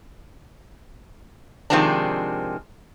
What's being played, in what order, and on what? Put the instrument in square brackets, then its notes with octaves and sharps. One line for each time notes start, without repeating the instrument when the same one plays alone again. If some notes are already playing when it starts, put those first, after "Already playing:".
[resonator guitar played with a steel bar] C3 D#3 F3 G#3 C4 D4